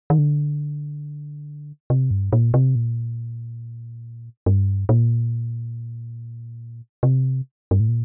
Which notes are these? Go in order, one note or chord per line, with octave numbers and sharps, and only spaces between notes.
D#3
D3
C3
G2
A#2
C3
A#2
G2
A#2
C3
G2
A2
A#2